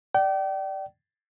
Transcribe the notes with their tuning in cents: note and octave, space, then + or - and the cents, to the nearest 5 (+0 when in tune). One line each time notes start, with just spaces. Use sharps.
D5 +10 G5 -35